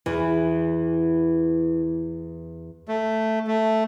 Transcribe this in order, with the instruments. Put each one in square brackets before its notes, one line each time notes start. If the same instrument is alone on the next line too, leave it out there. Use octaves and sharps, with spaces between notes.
[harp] E2 [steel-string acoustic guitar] E3
[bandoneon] A3
A3